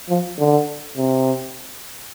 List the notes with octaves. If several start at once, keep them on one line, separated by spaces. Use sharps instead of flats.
F3
D3
C3